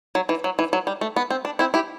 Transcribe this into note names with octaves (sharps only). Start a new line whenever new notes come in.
F#3
E3
F#3
E3
F#3
G3
A3
B3
C4
D4
C4 E4
E4 G4